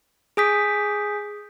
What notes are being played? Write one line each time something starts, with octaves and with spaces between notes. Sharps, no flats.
G#4 G#5 D#6 G6 B6